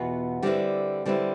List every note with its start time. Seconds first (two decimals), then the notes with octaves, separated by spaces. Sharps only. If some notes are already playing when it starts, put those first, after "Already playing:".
Already playing: E2 B2 B3 F4 B4
0.42 D3 G3 C4 E4 B4
1.06 D3 G3 C4 E4 B4